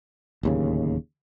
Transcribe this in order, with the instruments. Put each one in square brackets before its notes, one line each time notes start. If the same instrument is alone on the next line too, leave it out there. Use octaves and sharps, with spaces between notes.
[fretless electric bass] D1 D#2 C#3